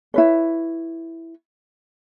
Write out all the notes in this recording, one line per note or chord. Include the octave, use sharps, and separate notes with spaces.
E4 B4 C#5